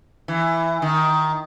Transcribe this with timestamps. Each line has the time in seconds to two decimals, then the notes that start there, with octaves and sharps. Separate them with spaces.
0.28 E3
0.82 D#3